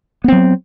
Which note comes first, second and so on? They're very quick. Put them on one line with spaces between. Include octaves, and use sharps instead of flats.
B3 C4 F#3